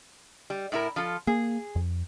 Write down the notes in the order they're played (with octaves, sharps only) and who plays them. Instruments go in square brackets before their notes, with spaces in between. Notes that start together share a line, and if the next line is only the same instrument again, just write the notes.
[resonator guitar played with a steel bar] G3
A2 E4 A#4
F3 F4 A4
[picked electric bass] A#3 [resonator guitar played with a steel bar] G#4
[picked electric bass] F2